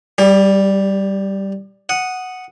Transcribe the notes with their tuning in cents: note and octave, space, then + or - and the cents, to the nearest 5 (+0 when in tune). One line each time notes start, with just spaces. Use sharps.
G3 -5 G4 +40
F#5 +0 D#6 +0